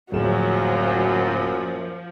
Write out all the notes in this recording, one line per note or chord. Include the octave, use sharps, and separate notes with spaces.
D1 F#2 A#2 F3 F#3 G#4 E7